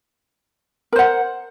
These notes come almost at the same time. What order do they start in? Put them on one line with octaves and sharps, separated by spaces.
A#4 C5 F#5